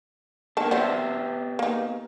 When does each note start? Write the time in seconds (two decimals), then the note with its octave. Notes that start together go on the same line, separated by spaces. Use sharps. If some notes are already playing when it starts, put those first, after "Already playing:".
0.57 D#3 A#3 B3 D4 A5
0.71 F#3 G3 B3 G4 C5 E5
1.59 A#3 D#4